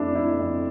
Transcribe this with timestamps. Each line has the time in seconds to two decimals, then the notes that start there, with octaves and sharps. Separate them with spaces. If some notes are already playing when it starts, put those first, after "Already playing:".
Already playing: F2 A3 D4 E4
0.14 F2 E4
0.40 F2